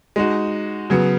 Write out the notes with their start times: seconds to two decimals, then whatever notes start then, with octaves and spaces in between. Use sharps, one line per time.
0.16 G#3 D#4 F#4
0.90 C#3 F#3 B3